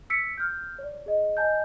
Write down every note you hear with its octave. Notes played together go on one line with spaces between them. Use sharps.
E6 B6 C#7 D7
F6 G6
C#5 D5
G#4 D#5
D#5 G#5 A5 G6